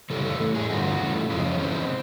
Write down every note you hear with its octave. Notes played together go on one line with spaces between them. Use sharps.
C#3 E3 G3 A4
A4
A2 E3 A3
G#4
G2 D3 G3 B3 F#4
C#3 E3 A3
F2 C#3 F3 G#3 F4
C#4
C3 E3 G#3 B3 C4